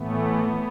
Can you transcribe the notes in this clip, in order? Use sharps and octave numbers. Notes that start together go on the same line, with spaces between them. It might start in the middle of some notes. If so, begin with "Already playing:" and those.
Already playing: A2 E3 A3 B3